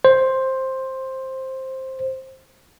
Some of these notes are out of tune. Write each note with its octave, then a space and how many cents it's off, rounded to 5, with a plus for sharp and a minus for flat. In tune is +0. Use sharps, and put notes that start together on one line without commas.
C5 +10